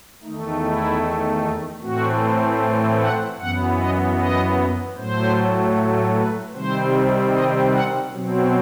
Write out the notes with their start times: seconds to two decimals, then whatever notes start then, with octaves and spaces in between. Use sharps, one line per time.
0.23 E2 D#3 A3 D#4
0.63 E4
1.81 A2 E3 A3 C4 F#4
2.60 A4
3.00 F#5
3.39 F#2 E3 B3 F#5
3.78 D#5
4.17 D#5
4.96 A2 F#3 A3 C5
6.15 B4
6.53 C3 D#3 G3 C4 C5
7.32 D#5
7.72 F#5
8.11 B2 F#3 C4